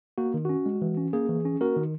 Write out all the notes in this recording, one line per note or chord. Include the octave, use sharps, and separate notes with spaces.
A#3 F#4
D#3
C#4 F#4
G#3
E3
C#4
A#3 G#4
E3
C#4
A#3 F#4 A#4
D#3